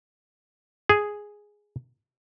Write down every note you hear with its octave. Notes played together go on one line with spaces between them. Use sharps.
G#4